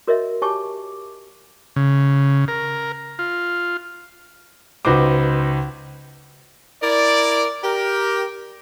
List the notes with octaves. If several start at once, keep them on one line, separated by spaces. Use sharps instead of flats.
F#4 A#4 C#5 D#5 E5
G4 C#5 G#5 A5 C#6 D6
C#3
A#4
F4
C#2 D#4 F#4 B4 C5 D6
E4 A#4 D5
G4 A#4